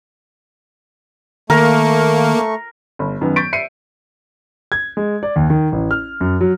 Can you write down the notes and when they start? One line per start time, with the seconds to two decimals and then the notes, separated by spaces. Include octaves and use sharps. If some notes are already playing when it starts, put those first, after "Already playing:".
1.50 D#3 A3 A#3 A#4 C#6
2.99 G1
3.21 F#2 D#3 B3
3.36 C#6 G6 A6 B6 D7
3.53 E5 C7 C#7 D#7
4.72 G#6
4.97 G#3
5.23 D5
5.36 D#2
5.50 D#3
5.72 A1
5.91 F6
6.21 F#2
6.41 F#3